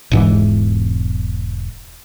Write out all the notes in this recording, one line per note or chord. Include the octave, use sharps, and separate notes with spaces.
E1 G#2 E3